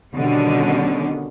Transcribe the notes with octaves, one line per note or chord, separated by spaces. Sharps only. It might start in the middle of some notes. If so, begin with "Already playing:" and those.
B2 D3 D#3 G3 C#4